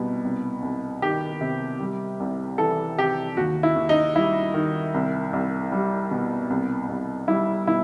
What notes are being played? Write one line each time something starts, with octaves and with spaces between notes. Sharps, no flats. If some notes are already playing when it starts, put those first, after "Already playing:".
Already playing: C2 B2 G3
C2
C2
D#3 G4
C3
G3
C2
E3 A4
C3 G4
D#2 F#4
E4
D#2
D#4
G3 E4
D#3
C2
C2
G3
B2
C2
C2
G3 E4
B2 E4